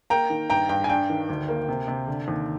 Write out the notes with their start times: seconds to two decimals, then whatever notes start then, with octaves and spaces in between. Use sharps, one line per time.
0.10 A#3 G5 A#5
0.30 D#3
0.50 G2 G5 A#5
0.69 G2 G5
0.84 G#5
0.89 D4 G5
1.10 D#3
1.29 D2
1.48 A#3
1.69 C3
1.88 C3
2.07 D3
2.28 D#2